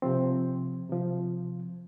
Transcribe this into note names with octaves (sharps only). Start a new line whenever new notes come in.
C3 F3 C4
C3 F3